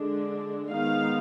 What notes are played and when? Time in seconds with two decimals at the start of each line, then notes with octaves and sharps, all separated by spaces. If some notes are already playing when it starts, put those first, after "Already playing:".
Already playing: D3 G#3 D4
0.70 D#3 G#3 B3 D#4 F5